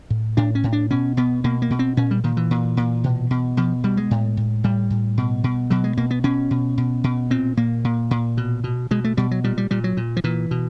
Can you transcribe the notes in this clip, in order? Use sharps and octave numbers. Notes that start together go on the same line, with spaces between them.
A2
A2 D4
C#4
A2
D4
B2 C#4
B2 B3
B2 A#3
A#3
B2
C4
A#2 C#4
G3
A#2 D#3
E3
A#2
A#2
B2
B2
B2 F3
B2 G3
G#3
A2
A2
A2 G3
A2
B2
B2
B2 F#3
G#3
B2 A#3
B3
B2 C#4
B2
B2
B2
A#2 C4
A#2 A#3
A#2
A#2
B2
B2
B2 G#3
A3
B2 G3
F#3
A#2 G3
G3
A#2 G3
F#3
A#2
F3
A#2 E3
B2